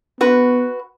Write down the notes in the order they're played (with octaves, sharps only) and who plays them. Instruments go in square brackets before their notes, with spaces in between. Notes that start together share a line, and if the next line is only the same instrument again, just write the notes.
[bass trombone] B3 [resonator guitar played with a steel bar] F#4 B4